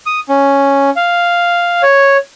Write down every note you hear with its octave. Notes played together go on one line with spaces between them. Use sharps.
D#6
C#4
F5
C#5